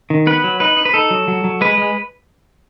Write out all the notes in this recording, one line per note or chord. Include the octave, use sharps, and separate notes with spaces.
D#3
B3 B4
F#3
D#4 B4
D#4
B4
D#4 A4
F#3
F#3
F#3
G#3 B4
G#3